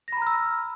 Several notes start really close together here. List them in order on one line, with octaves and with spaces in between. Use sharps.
A#6 B5 A#5 F6 E6